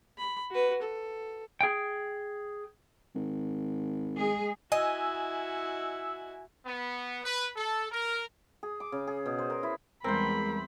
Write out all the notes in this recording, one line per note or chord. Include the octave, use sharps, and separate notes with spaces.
B5
F#4 B4
A4
G#4 G5
G#1
G#3 G#4
E4 F#4 D#5 G#5 E6
B3
B4
A4
A#4
G#4
D6
C#3
G#4
B2
C5
A#4
E4
E2 G3 G#3 C4 A#4 C5 B5